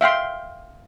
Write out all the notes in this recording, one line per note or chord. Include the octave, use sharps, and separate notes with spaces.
E5 F5 G5 C6